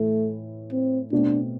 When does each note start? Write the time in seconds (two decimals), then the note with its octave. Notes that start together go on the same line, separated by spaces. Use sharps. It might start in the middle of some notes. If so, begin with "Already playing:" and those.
Already playing: A2 E3 A3 E4
0.72 C4
1.12 B2 A3 C4 D4